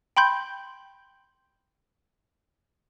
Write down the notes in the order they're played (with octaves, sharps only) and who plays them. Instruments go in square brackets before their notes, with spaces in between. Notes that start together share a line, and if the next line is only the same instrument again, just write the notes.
[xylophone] G5 B5 C6 G6